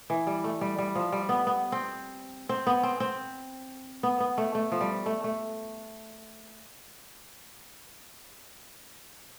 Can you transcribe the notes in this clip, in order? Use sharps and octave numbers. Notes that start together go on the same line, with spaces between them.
E3
G3
A3
G3
G3
F3
G3
B3
B3
C4
C4
B3
C4
C4
B3
B3
A3
A3
F3
G3
A3
A3